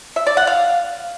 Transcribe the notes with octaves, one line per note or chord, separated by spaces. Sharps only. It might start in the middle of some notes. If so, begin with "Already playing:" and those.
E5
D5
F#5
F5